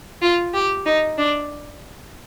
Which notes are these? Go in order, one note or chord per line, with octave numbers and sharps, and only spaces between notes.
F4
G4
D#4
D4